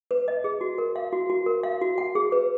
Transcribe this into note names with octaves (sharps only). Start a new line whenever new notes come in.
B4
D#5
G#4
F#4
A#4
F5
F#4
F#4
A#4
F5
F#4
F#5
G#4
B4